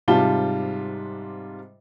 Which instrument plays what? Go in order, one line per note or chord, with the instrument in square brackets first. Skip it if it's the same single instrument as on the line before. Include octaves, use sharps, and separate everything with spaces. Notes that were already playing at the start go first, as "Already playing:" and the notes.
[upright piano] G#2 C3 G3 F4 A5 G7